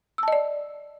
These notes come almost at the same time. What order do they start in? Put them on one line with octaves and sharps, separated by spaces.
E6 A5 D#5 D5